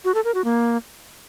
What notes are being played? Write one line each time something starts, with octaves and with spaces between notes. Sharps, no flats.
F#4
A4
A#4
F#4
A#3